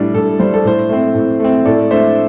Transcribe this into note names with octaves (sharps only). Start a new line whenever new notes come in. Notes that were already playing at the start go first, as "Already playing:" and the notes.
Already playing: A2 G3 D4
A2 A4
G3 D4 C5
A4
A2 C5
A3 C4
A2
A3 C4
A2 A4 D5
A3 D4 C5 E5